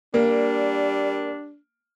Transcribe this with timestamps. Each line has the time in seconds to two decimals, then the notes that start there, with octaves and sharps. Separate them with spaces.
0.14 G3 A#3 D4